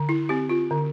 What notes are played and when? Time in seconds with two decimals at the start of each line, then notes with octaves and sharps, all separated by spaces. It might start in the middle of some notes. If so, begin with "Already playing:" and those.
Already playing: D3
0.09 E4
0.29 C4 G4
0.49 F4
0.71 D3